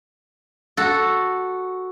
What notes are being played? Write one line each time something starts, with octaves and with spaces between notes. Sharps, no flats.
F#4 A4